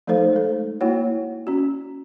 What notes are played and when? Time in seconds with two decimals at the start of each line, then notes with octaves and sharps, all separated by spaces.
0.07 F3 A3 D#4 A4 C5 F5
0.33 G#3 A4
0.81 A#3 E4 F#4 C#5 F#5
1.47 C#4 F#4